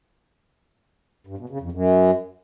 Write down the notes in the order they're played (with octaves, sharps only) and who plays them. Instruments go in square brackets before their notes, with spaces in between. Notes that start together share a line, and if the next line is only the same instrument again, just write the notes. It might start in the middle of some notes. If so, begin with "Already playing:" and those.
[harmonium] G2
B2
C#3
F2
F#2